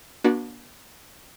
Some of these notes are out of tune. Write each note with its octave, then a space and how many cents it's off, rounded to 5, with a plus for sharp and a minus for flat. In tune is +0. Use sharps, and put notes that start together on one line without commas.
A#3 +45 D4 +0 F#4 +0